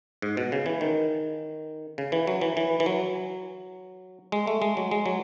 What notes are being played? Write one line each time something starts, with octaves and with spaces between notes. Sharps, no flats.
G#2
B2
C#3
E3
D#3
C#3
E3
F#3
E3
E3
E3
F#3
G#3
A3
G#3
F#3
G#3
F#3